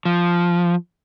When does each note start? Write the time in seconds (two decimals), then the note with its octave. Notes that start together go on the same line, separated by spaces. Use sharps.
0.05 F3